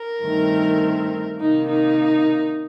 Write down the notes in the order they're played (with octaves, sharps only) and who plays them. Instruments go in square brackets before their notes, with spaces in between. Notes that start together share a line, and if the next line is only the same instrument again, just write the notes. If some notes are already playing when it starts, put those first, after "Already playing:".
Already playing: [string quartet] A#4
G2 D#3 A3 C4
C3 D#3 A#3 D#4
D#4